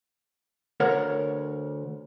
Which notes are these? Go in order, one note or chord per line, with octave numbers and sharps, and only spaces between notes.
D2 A#4 C#5 F#5